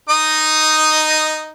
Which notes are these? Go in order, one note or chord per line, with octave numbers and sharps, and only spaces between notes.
D#4 D#5 D#6